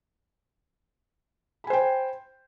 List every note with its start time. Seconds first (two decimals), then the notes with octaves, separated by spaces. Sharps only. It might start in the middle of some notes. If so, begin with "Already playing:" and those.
1.64 B5
1.67 G#5
1.70 C5
1.73 G5